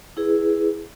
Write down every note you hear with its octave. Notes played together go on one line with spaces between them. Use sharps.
E4 G#4 B4